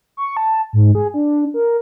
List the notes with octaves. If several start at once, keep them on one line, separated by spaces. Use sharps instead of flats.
C#6
A5
G#2
G#4
D4
A#4